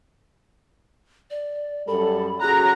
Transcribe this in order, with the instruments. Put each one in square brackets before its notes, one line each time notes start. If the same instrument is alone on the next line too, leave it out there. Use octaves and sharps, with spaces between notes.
[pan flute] D5
[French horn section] F#2 G3 A4 [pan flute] B5
[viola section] C#4 G#4 A#5 [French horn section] F#4 [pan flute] F#6